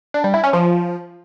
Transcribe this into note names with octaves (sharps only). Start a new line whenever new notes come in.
D4
G3
E4
C#4
F3